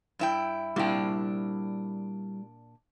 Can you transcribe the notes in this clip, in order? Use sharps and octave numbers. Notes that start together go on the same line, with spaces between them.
G2 E4 G5
A#2 G3 D4 E4 G5